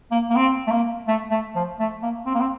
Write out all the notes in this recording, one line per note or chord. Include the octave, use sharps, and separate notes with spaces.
A#3
A#3
C4
A3
A#3
A3
A3
F3
A3
A#3
C4
A#3
C4